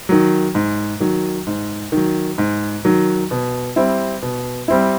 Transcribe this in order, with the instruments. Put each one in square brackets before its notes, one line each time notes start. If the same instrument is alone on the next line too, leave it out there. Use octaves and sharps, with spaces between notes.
[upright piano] D#3 F#3
G#2
D#3 F#3
G#2
D#3 F#3
G#2
D#3 F#3
B2
G3 C4 E4
B2
G3 C4 E4